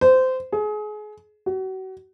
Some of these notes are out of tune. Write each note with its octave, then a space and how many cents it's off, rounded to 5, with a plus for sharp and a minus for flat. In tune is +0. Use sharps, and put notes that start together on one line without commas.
C5 -20
G#4 +30
F#4 +35